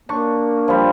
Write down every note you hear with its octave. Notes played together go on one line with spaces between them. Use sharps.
A#3 D4 C#6
F3 G3